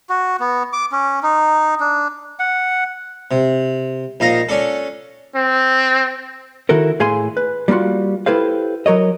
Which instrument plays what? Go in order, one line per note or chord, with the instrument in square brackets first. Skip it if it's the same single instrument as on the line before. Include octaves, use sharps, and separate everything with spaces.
[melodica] F#4
B3
D6
C#4
D#4
D4
F#5
[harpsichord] C3
A#1 D#4 F5 A#5
C#4 D4 A4
[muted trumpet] C4
[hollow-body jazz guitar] D#3 E4 F#4 A4 A#4
A2 G#4 F5 G#5 C6
B4
G3 A#3 D#4 F4 F#4
E4 G4 A4 B4 C5 F5
F#3 A#4 C#5 D#5